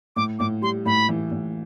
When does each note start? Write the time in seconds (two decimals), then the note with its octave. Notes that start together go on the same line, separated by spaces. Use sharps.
0.16 A2 D6
0.39 A2 D6
0.62 G3 C6
0.86 A2 B5
1.09 E3
1.32 A2